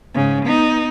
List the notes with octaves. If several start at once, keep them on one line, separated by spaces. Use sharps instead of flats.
G#2 C#3
B3 D#4